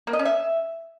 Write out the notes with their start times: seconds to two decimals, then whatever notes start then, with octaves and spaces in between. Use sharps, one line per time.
0.07 A#3
0.13 D#5
0.19 C#4
0.25 E5